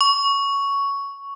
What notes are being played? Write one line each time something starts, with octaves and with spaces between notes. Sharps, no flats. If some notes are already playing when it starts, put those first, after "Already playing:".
C#6